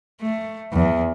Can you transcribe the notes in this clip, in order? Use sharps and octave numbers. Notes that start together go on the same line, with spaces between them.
A3
E2